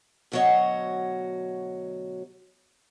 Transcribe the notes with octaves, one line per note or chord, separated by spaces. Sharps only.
D2 B2 F#3 F#4 C#5 D#5